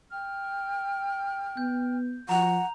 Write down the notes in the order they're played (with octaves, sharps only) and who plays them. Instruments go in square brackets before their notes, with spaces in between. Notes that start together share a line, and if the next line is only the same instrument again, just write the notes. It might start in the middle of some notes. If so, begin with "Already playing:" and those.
[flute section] G5 F6
[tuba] B3 [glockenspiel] G6
[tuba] F3 [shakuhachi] F#5 [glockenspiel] A#5 F7